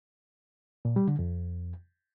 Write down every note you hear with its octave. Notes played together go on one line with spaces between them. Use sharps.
A#2
G3
D3
F2